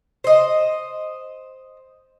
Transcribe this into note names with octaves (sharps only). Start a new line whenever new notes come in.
C5 D#5